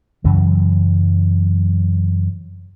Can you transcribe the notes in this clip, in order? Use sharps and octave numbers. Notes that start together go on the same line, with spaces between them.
F#2 C#3 E3 F#3